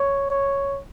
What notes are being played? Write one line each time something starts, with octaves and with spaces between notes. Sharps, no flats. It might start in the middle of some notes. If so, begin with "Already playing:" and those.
Already playing: C#5
C#5